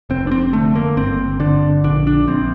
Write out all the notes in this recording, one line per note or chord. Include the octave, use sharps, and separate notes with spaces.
F1 C4
D4
C4
D3 A3
A#3
G1 C4
D3 D4
A#1 D4
D4
A#1 C4